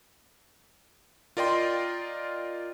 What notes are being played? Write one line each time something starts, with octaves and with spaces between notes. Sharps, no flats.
F4 A#4 D5 D#5 G5 C6